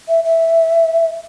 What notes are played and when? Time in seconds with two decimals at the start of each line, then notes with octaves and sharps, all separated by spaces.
0.08 E5
0.24 E5